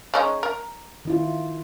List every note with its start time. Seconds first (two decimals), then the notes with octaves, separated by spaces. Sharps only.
0.14 G#3 C#4 D#4
0.43 A#4
1.05 D#3 E4 F4